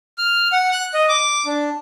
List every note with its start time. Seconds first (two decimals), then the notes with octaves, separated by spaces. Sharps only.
0.18 F6
0.52 F#5
0.72 F#6
0.94 D#5
1.09 D6
1.46 D4